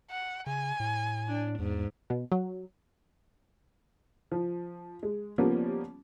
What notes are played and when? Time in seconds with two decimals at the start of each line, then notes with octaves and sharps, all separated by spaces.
0.10 F#5
0.47 C#3 G#5
0.80 A2
1.27 D4
1.59 E2 G#2
2.10 B2
2.32 F#3
4.31 F3
5.03 G#3
5.38 F3 G3 A#3 B3 C#4